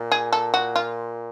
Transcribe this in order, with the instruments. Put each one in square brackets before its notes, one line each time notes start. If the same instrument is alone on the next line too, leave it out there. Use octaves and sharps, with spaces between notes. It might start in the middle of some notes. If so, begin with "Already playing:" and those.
Already playing: [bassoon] A#2
[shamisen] G#4
A4
F#4
F4